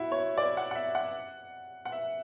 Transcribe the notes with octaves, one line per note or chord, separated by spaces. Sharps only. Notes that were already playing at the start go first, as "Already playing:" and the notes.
Already playing: E4 F#4
C#5
D5
F#5
F#5
E5
F#5
F#5
E5